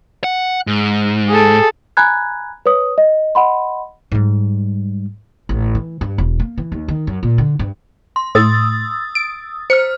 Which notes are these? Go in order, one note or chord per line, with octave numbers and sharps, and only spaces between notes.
F#5
G#2
G#4 A4
G#5 A#5 B5 F#6 G#6
B4 C#5 D#6
D#5
D#5 F#5 B5 C6
G#2 G3
A1
E3
G2
E1
A#3
E3
D#2
D#3
F#2
A#2
D3
G2
C6
A2 D#6 E6 A6
D7
C5 F6 C#7